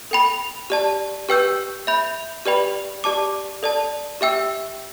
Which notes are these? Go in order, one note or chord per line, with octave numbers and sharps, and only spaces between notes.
A4 G5 B5
G4 D5 A5
G4 B4 G5 E6 G6
E5 B5 G6
G4 B4 D5 G5 B5
G4 D5 A5 D6
A4 D5 A5
G4 E5 G5 E6